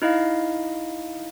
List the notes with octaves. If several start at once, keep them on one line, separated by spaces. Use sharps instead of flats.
D#4 E4 D#5 F5